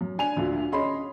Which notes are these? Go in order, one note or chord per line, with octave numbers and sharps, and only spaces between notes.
F#2
D4 G#5 F7
D2 A#2 D3
C#4 G#4 D#5 B5 C6